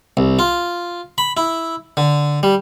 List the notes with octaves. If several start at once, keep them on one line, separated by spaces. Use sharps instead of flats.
C2
F4
B5
E4
D3
G3